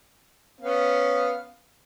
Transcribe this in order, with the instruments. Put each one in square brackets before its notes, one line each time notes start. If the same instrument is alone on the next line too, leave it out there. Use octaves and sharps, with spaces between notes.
[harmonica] B3 C#4 F5